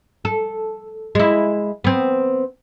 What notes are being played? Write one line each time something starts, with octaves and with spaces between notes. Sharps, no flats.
A4
G#3 E4
B3 C4